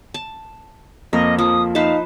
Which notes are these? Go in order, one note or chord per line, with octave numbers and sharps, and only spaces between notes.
A5
F2 A#3 A#4 D#5
F3 D#6
D#4 B4 C5 F5 A5